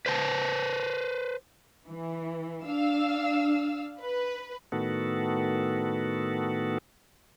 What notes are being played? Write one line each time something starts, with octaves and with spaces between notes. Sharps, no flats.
B4 C5 A5
E3
D4 F5 E6
B4
A2 D#3 B3 F#4 A4